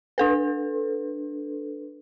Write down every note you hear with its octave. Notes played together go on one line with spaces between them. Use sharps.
D4 A4 B4